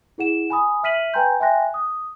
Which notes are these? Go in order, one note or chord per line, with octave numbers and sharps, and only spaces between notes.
E4 G#4 F#5 E7
G#5 B5 D#6
E5 F6 B6 D#7 F#7
B4 G5 G#5 A#5 C6 G6
E5 G5 G#5 C6 F#6 A#6
D#6